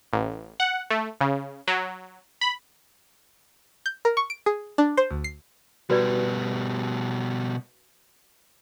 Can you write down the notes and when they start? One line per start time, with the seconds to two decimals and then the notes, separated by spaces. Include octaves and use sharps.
0.13 A1
0.60 F#5
0.90 A3
1.21 C#3
1.68 F#3
2.41 B5
3.86 G6
4.05 A#4
4.17 C#6
4.30 D7
4.46 G#4
4.78 D4
4.97 C5
5.11 D2
5.24 C7
5.90 B2 G3 F#4 B4 D5